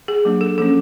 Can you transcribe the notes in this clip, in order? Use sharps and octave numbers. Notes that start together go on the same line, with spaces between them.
G#4
F#3 A#3 D4
A4
F3 A#3 C#4 A4